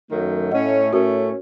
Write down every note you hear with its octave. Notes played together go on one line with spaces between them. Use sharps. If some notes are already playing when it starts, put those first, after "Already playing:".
F#2 D#3 F#3 A3
A2 A3 C#4 D#5 F#5
A2 A3 C#4 F#4 A#4